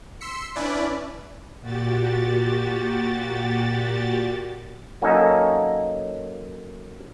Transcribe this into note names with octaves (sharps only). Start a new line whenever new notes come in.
C6 E6 B6 C#7
C#4 D4 E4 B4 D5
A#2 F#4 G4 A6
F#3 A#3 C#4 D#4 A4 D#5